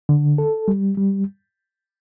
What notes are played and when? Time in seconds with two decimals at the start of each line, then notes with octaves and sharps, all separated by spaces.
0.09 D3
0.38 A4
0.68 G3
0.98 G3